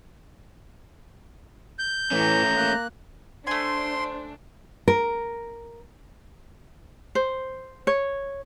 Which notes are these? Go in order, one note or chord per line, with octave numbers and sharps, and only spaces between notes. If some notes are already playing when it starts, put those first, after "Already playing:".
G6
A2 E3 A3 C#4 A#5
A#3 F#6
A3 D4 C5 G#5 C6
A#4
C5
C#5